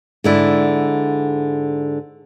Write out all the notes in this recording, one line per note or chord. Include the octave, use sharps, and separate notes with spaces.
G#2 D3 E4